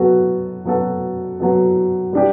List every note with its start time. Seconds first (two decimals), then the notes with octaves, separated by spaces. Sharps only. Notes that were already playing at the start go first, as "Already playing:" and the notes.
Already playing: F#3 B3 F#4 A4
0.65 F#3 B3 F#4 A4
1.40 F#3 B3 F#4 A4
2.13 G3 D4 G4